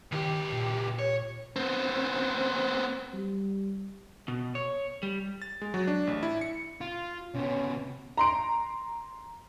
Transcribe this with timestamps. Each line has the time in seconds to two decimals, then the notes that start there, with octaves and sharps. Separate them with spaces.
0.12 C#2 D#3 G4
0.52 A#2
0.99 C#5
1.56 B3 C4
3.14 G3
4.28 B2
4.55 C#5
5.03 G3
5.42 A6
5.62 G#3
5.74 F#3
5.87 D4
6.07 A1
6.23 E4
6.41 C#7
6.81 F4
7.34 C3 B3 C#4
8.17 A#5 C6 D7